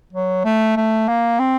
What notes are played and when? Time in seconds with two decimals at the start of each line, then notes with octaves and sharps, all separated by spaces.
0.13 F#3
0.45 A3
0.77 A3
1.08 A#3
1.39 C4